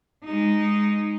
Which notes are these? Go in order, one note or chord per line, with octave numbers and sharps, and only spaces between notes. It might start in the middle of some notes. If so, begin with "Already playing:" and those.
G#3 D#4